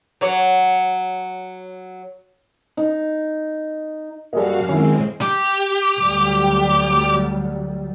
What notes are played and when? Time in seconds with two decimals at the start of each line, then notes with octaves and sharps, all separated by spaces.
0.21 F#3 C#5
2.77 D#4
4.33 F#2 G3 A#3 F#4 G#4 A4 D#5 F5
4.69 D#3 G#3 C4 C#4 E4
5.22 G4
5.96 D2 F#3 G3